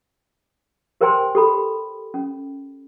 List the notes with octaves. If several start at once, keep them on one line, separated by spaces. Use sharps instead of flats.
G4 A#4 C5 G5 G#5 C6
G4 A4 B5
C#4